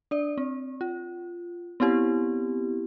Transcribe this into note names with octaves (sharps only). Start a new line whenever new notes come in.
D4 D5
C4
F4
B3 C4 E4 G4